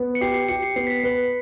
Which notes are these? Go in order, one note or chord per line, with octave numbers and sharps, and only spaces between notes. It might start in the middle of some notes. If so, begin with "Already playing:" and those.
Already playing: B3
C#7
G4 C7
C7
G4 C#7
C7
B3 C7
B6
B4 C7